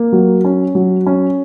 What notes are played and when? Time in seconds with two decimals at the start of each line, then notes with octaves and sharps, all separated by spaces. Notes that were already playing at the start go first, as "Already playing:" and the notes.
Already playing: A#3
0.13 F#3
0.45 C#4
0.75 F#3
1.06 C#4